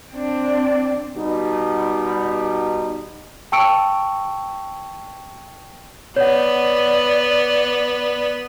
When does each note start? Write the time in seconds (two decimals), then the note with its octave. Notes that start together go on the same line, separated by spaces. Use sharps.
0.12 C4 D4
1.17 B2 G3 D#4
3.52 G5 A5 C#6 E6 C#7 D7
6.16 B3 C#5 D5 F#5